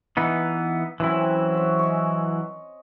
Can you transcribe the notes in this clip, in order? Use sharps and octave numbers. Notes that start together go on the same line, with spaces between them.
E3 B3 D#4
E3 F#3 C4 C#4 E4
C5 C#5
D#5 G#5 C#6